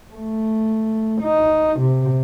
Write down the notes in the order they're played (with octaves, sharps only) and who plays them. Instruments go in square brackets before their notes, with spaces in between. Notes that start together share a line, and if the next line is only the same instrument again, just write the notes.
[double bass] A3
D#4
C3